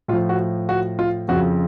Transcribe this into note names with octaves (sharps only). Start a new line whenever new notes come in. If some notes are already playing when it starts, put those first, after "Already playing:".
A2 F3 F4
F#4
F#4
F4
F2 C#3 F3 F#4